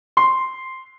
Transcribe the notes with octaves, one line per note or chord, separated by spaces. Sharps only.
C6